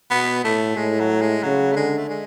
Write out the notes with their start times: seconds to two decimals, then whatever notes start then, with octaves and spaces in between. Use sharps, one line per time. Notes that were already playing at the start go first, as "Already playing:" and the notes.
0.10 B2 B3
0.44 A2 A3
0.77 A2 G#3
1.00 F#3
1.21 G#3
1.43 C#3 F#3
1.72 A3
1.76 D3 G#3
1.98 A3
2.09 G#3